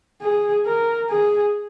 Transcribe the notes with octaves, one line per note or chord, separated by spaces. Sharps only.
G#4
A#4
G#4